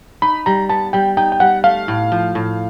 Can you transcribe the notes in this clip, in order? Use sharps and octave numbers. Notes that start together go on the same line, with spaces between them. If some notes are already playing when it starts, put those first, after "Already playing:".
D#4 B5
G3 A#5
B3 A5
G3 G5
D#4 G5
G5
G3 F#5
A3 F5
A2
F3
A2